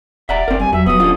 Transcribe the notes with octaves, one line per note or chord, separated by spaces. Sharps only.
D#1 D5 E5 F#5 A#5
F#1 C4 A#4
G2 G#5
E2 F#3 E5
D1 F#3 B3 D#6
D3 C#4 F4